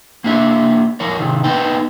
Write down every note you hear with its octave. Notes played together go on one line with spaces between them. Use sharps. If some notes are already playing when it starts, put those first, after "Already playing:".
A#3 D4 G4 E5
F3 A#4 C#5
C3 D#3
B3 D#4 B4 G5